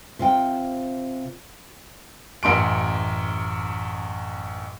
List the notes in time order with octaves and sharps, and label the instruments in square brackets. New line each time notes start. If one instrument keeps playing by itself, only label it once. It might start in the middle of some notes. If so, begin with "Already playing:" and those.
[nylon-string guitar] C3 F4 G5
[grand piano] A1 F#2 C6 D7